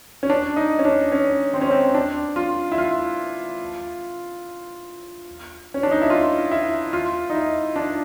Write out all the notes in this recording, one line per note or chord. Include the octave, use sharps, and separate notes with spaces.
C#4
D4
D#4
C#4
D4
C#4
C4
C#4
C4
D4
F4
E4
F4
C#4
D4
D#4
E4
F4
E4
F4
D#4
E4
D4